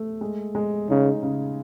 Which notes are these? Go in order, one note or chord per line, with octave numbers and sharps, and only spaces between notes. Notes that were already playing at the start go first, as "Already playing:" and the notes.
Already playing: A3
G#3
G#3
C#3 D#4
C#3